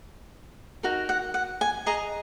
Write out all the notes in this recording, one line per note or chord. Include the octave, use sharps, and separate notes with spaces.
D#4 F#4 A#4
F#5
F#5
G#5
G#4 D#5 A#5